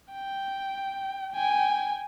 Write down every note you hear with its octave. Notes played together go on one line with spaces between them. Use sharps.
G5
G5 G#5